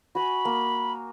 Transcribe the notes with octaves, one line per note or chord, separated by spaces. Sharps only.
F#4 G#5 B5
A#3